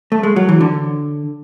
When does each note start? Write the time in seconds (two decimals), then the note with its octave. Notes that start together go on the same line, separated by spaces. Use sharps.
0.12 A3
0.23 G#3
0.36 F#3
0.49 E3
0.60 D3